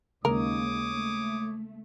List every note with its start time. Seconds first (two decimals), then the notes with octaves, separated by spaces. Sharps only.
0.25 D#2 C#3 G#3 A#3 A#4 C#5 D6 D#6
0.90 A3